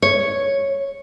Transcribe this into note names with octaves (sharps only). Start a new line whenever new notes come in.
C#5